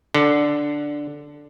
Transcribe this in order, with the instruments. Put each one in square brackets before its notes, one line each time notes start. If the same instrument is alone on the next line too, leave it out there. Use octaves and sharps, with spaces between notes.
[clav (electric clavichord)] D3